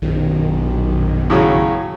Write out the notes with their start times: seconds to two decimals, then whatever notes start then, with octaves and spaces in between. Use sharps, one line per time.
0.02 A#1 F#2 B2 D#3
1.30 A2 C#3 F#3